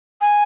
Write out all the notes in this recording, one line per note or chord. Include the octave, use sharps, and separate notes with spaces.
G#5